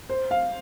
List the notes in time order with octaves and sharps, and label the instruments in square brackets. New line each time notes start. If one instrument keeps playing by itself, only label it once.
[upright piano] C5
F5